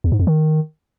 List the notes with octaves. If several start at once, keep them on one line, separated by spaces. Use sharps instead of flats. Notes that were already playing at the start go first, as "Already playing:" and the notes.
E2
G#2
F2
D#3